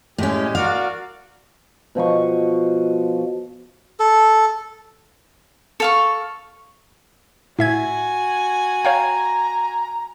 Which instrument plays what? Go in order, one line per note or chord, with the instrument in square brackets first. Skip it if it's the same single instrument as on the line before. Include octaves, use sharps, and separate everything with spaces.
[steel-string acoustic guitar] A2 C#4 [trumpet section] G#3 G4
[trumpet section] F#4 A#4 D5 [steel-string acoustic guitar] F5
[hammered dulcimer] B2 F3 D#5 C#6
[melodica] A4
[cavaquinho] A4 F5 C#6
[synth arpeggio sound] A2 E5 G#6 [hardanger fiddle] F#4 G#5
[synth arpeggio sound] C#5 F5 G5 [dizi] A#5